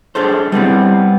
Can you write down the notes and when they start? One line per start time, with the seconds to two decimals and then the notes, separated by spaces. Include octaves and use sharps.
0.15 D4 G#4 A4 C5
0.52 G3 B3 C4 E4